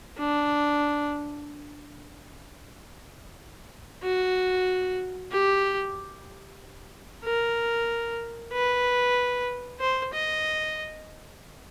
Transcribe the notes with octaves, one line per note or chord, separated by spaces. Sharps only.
D4
F#4
G4
A#4
B4
C5
D#5